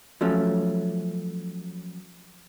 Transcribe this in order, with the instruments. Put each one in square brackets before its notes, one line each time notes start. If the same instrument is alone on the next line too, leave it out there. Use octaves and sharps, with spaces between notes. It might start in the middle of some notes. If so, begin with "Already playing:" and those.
[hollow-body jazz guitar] F3 F#3 A3 C#4